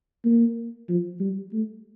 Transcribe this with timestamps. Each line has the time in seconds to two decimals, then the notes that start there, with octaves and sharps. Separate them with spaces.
0.25 A#3
0.89 F3
1.20 G3
1.53 A3